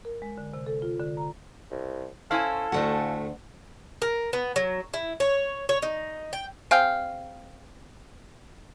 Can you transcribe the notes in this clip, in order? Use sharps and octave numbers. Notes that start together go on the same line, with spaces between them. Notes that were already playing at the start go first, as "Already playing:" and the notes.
A#4
G#3
D3
C3
A4
F4
D3
A#5
C2
C#4 E4 A4 C5 F5 G#5
D2 A2 A3 F#4 F#5
A#4
B3
F#3
E4
C#5
C#5
D#4
G5
C4 G#4 F5 G5